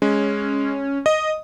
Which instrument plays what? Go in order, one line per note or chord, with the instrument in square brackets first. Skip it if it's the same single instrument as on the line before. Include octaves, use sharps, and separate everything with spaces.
[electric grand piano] G#3 [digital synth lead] C#4
[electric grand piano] D#5 [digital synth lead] D#6